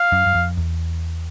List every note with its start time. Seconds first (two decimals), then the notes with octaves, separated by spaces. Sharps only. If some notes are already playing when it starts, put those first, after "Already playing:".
Already playing: F5
0.12 F#2
0.26 F#2
0.35 F2
0.57 E2